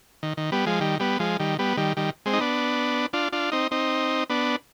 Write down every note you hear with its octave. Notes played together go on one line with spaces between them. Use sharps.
D#3
D#3
G3 B3
F3 G#3
D#3 G3
G3 B3
F3 G#3
D#3 G3
G3 B3
D#3 G3
D#3 G3
G#3 C4
D#4
B3 D4
D4 F4
D4 F4
C4 D#4
C4 D#4
B3 D4